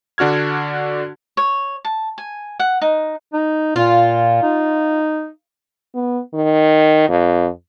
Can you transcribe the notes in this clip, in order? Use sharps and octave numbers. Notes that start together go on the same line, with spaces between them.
D3 D4 F#4 F6 G#6
C#5
A5
G#5
F#5
D#4
D#4
A#2 F4
D#4
B3
D#3
F2